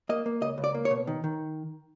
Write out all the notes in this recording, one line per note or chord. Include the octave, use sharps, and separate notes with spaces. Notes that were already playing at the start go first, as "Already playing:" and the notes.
A#3 D#5
A#3
C#2 D#5
C#2
D5
A#3
C#5
B2
D#3
D#3